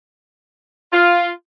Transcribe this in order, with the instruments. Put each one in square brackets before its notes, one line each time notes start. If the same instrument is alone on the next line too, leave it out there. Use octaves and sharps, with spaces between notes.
[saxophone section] F4